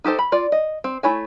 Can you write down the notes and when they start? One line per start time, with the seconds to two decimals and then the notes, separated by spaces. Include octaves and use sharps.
0.04 D#4 G4 A4 C5
0.19 B5
0.32 F4 D5
0.52 D#5
0.84 C4
1.03 A3 E4 C#5 G#5